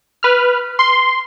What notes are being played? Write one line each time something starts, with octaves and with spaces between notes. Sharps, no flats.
B4 F6
C6